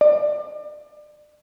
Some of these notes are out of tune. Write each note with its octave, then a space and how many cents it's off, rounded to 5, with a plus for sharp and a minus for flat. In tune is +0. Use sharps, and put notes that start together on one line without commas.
D5 +35